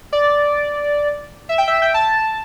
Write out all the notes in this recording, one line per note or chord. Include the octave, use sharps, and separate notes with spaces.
D5
E5
G5
E5
G5
A5